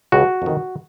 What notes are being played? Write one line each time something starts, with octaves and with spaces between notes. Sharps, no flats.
C#2 C#3 F#4
F2 D#3